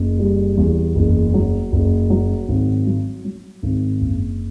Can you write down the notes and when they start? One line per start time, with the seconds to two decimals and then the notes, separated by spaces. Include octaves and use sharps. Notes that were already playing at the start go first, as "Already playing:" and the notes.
Already playing: F#1
0.19 G3
0.57 E2
0.95 F#1
1.34 F#3
1.72 F#1
2.10 F#3
2.48 G#1
2.86 F#3
3.25 F#3
3.63 G#1
4.01 F#1